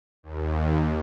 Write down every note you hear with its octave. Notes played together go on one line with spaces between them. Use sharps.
D#2